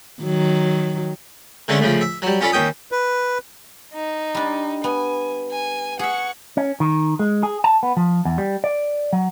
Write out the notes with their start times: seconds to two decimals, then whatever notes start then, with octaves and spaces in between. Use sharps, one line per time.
0.22 D#3 F#3
1.68 D3 G#3 A3 C#4 D4
1.80 A2 C#3 F3
2.01 E5
2.22 F#3 G3
2.41 C#4 F4 A4 D5 B5
2.52 D#2 C#4 G5 D#6
2.92 B4
3.93 D#4
4.34 G3 D4
4.84 B3 G#5
5.51 G#5
5.99 G#4 E5 F#5 C#6
6.57 C#4
6.80 D#3
7.19 G#3
7.43 G#4
7.64 A5
7.83 B3
7.97 F3
8.25 E2
8.38 G3
8.64 D5
9.13 F#3